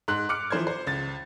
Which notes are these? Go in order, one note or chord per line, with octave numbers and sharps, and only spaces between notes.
G#2 C6 F#6
D6 F6 F#6 C#7
E3 F3 C5 C6 G#6
C5
C#2 A6